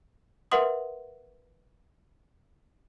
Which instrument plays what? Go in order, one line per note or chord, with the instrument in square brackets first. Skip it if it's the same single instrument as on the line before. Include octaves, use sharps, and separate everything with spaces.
[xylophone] A#4 B4 E5 F#5 C6 D#6